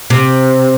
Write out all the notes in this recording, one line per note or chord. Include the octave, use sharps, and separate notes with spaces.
C3